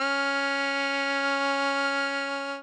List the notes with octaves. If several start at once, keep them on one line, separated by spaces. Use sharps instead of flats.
C#4 F6